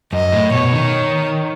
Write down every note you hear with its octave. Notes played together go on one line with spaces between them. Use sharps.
F#2 D#5
A2
B2 C#5
D#3